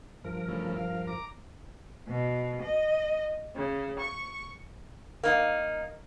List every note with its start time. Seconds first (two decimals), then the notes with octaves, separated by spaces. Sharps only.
0.25 G2 F3 A#4
0.48 C#3 E3 A3
0.76 F5
1.07 A#5 D6
2.07 B2
2.62 D#5
3.55 C#3
3.98 C#6
5.23 A#3 D#4